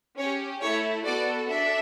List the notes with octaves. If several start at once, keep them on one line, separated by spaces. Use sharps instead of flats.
C#4 G4 C#5
A3 E4 A4 C#5
B3 F#4 A4 D5
D4 A4 E5